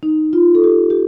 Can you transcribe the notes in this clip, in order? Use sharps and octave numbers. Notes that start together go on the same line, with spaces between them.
D#4
F4
A4
G4
G4